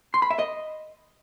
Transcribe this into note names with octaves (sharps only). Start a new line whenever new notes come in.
C6
B5
E5
D#5